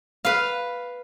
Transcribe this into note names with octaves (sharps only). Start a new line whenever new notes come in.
B4 F5